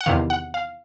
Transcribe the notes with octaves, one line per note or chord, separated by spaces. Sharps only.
F#5
E2 C3 D#3 F5
F#5
F5